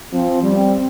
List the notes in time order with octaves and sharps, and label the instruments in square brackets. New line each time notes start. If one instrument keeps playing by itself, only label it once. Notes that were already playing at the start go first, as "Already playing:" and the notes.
[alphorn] F3 [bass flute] C4
[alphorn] G3
[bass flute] C4